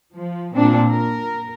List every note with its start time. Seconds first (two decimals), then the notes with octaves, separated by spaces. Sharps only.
0.14 F3
0.54 A#2 C4 D4
0.90 A#4